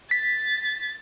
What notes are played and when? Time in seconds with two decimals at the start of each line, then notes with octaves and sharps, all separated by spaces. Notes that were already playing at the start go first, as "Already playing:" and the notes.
0.11 A6 B6